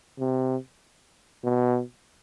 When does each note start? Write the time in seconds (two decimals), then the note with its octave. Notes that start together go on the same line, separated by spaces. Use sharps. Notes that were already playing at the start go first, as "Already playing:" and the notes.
0.19 C3
1.44 B2